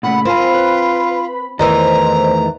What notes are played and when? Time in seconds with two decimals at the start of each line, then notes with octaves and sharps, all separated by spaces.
0.03 A#2 C#3 A3 F#5 B5
0.25 C4 F4 A#4 C5 G#5
0.54 B4
1.59 E2 D#3 E3 A3 C5 D#5 A#5